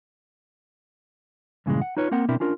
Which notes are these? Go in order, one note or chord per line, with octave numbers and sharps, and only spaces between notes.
G2 A#2 C#3 E3 G3 G#3
F#5
D#4 F4 B4 C#5
A#3 C4 A#4 F#5
B2 C4 D4 E4 A#4
C#4 D4 F4 A#4